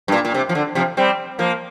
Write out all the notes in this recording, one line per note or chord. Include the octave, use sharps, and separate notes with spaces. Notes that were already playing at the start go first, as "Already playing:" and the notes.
G2
A#2
A#2
C3
F3
D3
C3 F3
G3 C4
F3 A#3